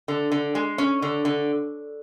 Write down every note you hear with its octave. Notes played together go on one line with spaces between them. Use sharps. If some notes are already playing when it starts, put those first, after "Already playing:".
D3
D3
G#3
C#4
D3
D3